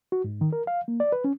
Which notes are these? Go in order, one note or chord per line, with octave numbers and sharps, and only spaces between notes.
F#4
G#2
D#3
A#4
F5
A#3
D5
B4
C#4